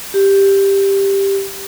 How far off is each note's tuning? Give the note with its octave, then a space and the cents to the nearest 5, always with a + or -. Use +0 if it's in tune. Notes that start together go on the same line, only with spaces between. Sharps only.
G4 +5